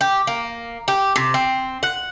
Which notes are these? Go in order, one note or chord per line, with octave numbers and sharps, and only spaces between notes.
G4
A#3
G4
C3
C4
F#5